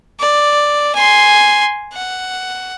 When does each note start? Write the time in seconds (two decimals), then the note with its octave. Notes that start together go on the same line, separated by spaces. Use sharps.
0.20 D5
0.95 G#5 C6
1.93 F#5